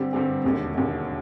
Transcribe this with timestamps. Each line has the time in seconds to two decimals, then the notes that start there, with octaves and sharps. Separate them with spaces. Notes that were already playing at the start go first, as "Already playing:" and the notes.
Already playing: G2 D3 G3 C4
0.13 G2 D3 G3 C4
0.44 E1 D#2 D3
0.74 E1 D#2 D3